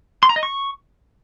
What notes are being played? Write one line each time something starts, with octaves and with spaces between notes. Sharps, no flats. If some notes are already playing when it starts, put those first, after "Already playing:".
C6
A#5
D#5
C#6